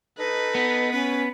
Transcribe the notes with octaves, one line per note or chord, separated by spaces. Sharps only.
D#4 A4 B4 D#5
B3
C#4 B4